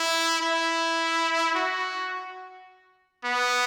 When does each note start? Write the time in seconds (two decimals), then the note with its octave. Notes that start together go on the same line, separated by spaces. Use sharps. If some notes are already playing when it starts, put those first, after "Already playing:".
Already playing: E4
0.42 E4
1.55 F#4
3.25 B3